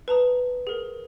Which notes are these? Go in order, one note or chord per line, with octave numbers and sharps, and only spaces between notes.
B4 A5 A#5 D#6
G#4 A#4